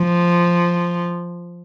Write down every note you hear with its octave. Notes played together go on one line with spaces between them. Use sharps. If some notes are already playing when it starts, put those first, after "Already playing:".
Already playing: F3